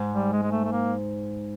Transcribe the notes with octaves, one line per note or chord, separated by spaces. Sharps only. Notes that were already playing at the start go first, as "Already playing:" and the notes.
Already playing: G#2
G3
G#3
G#3
A3
A3
A#3